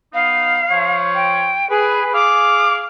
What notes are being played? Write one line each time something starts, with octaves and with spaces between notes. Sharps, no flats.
B3 D#4 F5
F3 C#5
G5
G#4 B4
G#4 F5 D6